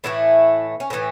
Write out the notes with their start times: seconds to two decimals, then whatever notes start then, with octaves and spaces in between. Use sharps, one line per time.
0.04 A2 E3 A3 E4
0.80 C#4
0.90 A2 E3 A3 B3